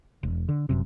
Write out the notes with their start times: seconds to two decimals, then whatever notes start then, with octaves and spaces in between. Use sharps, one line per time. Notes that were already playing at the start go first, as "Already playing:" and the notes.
0.23 E1
0.49 D3
0.69 G1 F#2 C3